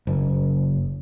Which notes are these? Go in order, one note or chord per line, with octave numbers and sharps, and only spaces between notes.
F#1